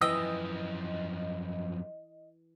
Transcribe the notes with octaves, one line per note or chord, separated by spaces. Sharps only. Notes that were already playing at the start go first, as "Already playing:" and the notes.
F#2 E3 F3 D#5 G5 E6